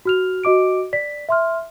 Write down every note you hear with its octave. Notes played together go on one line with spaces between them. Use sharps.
F#4 F6 F7
F#4 D#5 D6 D7
D5 B6
E5 C6 F6